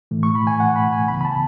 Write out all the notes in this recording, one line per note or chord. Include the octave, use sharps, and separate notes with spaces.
A2 E3 A3
C#6
B5
G#5
F#5
B5
G#5
C#2 C#3 E3 B3 B5
B5
A5